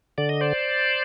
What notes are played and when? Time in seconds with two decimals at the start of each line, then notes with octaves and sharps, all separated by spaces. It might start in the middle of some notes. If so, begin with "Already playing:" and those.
0.18 D3 D5
0.29 D#5
0.41 C5 D5